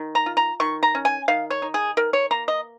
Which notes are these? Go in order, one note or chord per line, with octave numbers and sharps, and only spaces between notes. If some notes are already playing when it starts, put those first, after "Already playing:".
Already playing: D#3
A#5
F4
A#5
D#3 C#6
A#5
C#4
G#5
D#3 F5
C#5
D#4
G#4
D#3 A#4
C#5
A#3 A#5
D#5